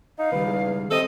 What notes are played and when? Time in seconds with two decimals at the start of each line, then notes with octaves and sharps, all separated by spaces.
0.19 D#4 F5
0.32 C#2 D#3 G3 B4
0.46 E2
0.91 C3 C4 A4 D#5